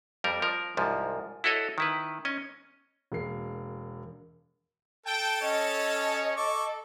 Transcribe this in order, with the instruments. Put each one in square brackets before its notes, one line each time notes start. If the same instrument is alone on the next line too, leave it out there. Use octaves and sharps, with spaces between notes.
[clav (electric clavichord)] F2 G3 A#4
F3 A#4
C2 G#2 F3
E4 F#4 A4 C#5 D#5
D#3 E4 B4
C#4 D#5
[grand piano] E1 A#3 C7
[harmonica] A4 A5 [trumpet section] G5
[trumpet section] C#4 C#5 [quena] D#5
[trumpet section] A4 [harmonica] C#6 D6